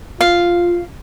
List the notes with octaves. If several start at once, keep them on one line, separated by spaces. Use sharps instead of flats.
F4 F5